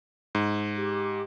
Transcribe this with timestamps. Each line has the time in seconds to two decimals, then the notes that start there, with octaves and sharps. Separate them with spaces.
0.35 G#2
0.76 G4